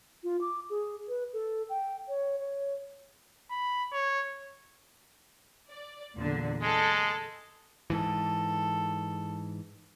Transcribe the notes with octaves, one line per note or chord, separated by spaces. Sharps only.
F4
D6
G#4
B4
A4
G5
C#5
C#5
B5
C#5
D5
E2 A#2 D3
G#3 A4
G#2 E3 A4